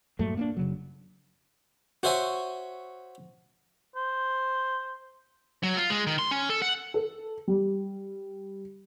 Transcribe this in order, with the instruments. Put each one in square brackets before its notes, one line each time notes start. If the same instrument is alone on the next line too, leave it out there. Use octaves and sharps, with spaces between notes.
[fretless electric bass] G2 A#2 F#3 A3
A#3 B3 D4
F#1 C#3 F#3
[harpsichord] F#4 C5 C#5 E5 G#5
[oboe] C5
[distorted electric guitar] F#3
F4
G#3
D#3
C6
C#4
A4
F#5
[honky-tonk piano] A4
G3